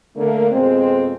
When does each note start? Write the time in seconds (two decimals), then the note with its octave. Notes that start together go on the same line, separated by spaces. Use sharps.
0.16 D3 A3 A#3
0.51 F2 B2 G#3 C4